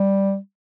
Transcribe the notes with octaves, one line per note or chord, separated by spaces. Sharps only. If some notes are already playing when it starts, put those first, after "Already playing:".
Already playing: G3